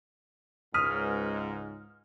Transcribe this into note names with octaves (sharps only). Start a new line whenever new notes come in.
C#2 G#2 D#6 F6 B6 D#7